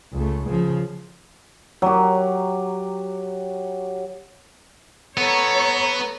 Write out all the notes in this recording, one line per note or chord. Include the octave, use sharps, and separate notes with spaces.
C#2 A3
C#3 F3
F#3 G4
B3 A4 C#5 A#5